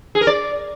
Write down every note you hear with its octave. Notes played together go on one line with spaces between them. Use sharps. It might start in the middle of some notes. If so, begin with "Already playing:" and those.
G#4
A#4
D5